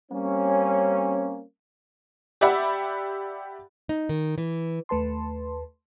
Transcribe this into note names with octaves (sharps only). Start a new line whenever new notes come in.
G3 A#3 C4 C#4
G4 D5 E5 F#5 B5
D#4
D#3
E3
D#2 A3 B4 A5 C6